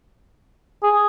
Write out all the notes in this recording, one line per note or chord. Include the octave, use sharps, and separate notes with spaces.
G#4